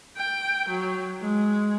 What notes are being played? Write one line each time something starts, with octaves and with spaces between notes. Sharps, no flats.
G5
F#3
G#3